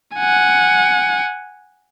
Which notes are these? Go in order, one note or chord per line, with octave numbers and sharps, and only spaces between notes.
F#5 G#5